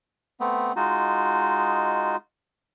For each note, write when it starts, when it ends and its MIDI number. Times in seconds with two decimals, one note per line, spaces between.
0.40 0.72 57
0.40 0.72 59
0.40 0.72 60
0.76 2.16 56
0.76 2.16 63
0.76 2.16 65
0.76 2.16 66